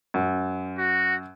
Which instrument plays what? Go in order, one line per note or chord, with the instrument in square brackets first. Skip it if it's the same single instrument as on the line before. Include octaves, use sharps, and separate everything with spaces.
[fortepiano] F#2
[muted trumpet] F#4